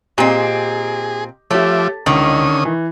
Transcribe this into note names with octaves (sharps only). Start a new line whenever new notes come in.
A#2 C4 G4 G#4 D#5
F3 A3 G4 C#5 E5 D6
C#2 D3 D#3 C#4 D#6
E3